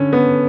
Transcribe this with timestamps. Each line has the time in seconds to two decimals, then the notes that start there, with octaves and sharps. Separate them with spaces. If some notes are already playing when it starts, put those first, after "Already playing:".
Already playing: D3 C#4
0.13 B3